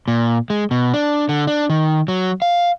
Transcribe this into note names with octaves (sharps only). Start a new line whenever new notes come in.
A#2
G#3
B2
D4
D3
D4
D#3
F#3
F5